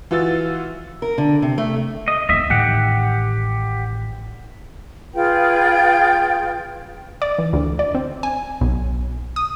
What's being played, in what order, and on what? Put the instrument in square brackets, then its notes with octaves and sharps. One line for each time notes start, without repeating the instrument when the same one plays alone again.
[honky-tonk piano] E3 F4 F#4 E6 A6
[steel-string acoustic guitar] A#4
D3
C3
A3
[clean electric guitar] D#5
[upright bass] D#2 B3 [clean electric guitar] D#5 E5
[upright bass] A1 D#3 [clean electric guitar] G4 F#5
[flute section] F4 G#4 B4 G5
[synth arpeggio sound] D5
E3
D2
D5
C4
G#5
B1
D#6